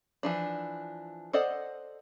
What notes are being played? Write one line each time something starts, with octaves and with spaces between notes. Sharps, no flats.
E3 F3 D4
A4 C5 D5 D#5 F#5